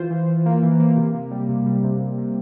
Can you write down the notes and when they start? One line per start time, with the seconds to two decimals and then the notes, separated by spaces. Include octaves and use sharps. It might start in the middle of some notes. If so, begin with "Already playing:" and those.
Already playing: E3 F4 C5
0.10 E3
0.28 E3
0.46 A#3
0.63 E3
0.80 A#3
0.97 C3
1.14 C3
1.31 G3
1.49 C3
1.66 G3
1.84 C3
2.01 C3
2.18 C3